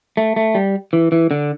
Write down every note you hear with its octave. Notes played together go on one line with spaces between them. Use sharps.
A3
A3
G3
E3
E3
D3